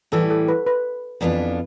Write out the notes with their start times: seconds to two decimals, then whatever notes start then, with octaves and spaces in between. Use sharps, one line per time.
0.12 A2 E3 G3 A4
0.30 A4
0.48 B4
0.67 B4
1.21 F2 E3 B3 D4 F4